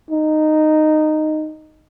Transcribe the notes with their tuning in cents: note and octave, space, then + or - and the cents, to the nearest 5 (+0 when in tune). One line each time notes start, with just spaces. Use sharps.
D#4 -10